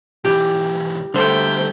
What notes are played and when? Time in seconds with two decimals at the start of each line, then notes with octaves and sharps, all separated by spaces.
0.25 B1 E3 G4
1.14 D3 G3 A3 A4 C5 G5